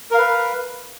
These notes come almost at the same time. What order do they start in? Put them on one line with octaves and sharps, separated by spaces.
A#4 F5 B4